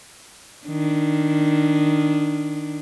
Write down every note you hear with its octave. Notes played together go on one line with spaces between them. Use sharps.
D#3 D4